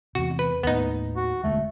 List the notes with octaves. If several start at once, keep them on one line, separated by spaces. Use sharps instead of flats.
E2 C3 F#4
B4
D#2 A2 B3 D#4
F#4
E1 D2 G#3 A3